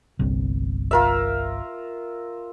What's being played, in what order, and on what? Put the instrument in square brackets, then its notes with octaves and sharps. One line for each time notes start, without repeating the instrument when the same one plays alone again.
[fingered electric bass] G1 C2
[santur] F4 A#4 E5